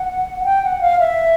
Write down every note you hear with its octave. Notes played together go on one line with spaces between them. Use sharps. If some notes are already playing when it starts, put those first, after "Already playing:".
Already playing: F#5
F#5
G5
F#5
F5
E5